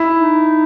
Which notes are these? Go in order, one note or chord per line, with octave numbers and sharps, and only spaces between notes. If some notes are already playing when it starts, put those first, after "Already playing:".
Already playing: E4
D#4